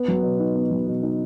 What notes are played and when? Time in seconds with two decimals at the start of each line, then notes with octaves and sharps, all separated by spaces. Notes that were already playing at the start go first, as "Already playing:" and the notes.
Already playing: B3
0.08 F#3
0.23 B2
0.39 D#4
0.55 B3
0.71 F#3
0.87 B2
1.02 D#4